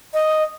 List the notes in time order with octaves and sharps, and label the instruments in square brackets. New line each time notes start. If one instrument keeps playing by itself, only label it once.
[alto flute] D#5